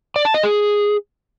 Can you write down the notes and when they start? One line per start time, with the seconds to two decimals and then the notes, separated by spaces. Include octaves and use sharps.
0.16 D5
0.25 A5
0.34 D#5
0.43 G#4